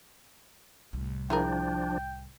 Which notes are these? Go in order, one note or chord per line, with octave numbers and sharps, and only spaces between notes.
C2 A2
F3 D4 E4 G#4 A#4 G5